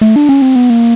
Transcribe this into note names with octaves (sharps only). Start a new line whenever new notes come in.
A3
D4
C#4
C4
B3
A#3